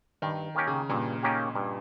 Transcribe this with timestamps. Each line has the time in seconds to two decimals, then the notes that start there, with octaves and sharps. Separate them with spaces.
0.22 G2 D#3
0.55 D#3 A#3 C#4 G4
0.67 C#3
0.90 G2 A#2
1.23 D#3 A#3 C#4 G4
1.55 G2